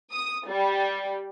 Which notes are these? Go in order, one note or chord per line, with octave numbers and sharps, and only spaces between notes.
D#6
G3